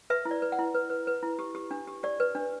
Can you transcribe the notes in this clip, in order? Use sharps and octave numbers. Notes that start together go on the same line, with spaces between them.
B4 E5
E4
D5
B4
F#5
E4
B4
B4
B4
E4
G4
G4
D4
G4
G4 D5
B4
D4